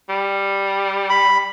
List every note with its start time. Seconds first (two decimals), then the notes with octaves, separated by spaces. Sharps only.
0.09 G3
1.10 B5